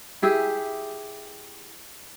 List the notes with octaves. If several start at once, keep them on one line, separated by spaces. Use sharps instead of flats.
E4 G4 G#4 E5